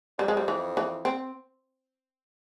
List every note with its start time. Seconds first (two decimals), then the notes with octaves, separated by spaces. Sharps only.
0.18 F2 G3
0.28 G#3
0.37 G3
0.48 E3
0.77 E3
1.05 C4